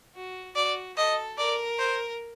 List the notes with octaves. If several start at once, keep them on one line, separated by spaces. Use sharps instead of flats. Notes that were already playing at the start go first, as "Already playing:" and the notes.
F#4
F#4 D5
A4 D#5
A#4 D5
C5